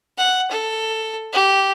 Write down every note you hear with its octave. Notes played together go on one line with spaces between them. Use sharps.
F#5
A4
G4